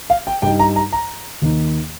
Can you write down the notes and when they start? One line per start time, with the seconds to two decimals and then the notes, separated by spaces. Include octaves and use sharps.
0.10 F5
0.27 G5
0.42 G2 G3 D#4 G5
0.59 A#5
0.76 A#5
0.93 A#5
1.42 D#2 D#3 A#3 D#4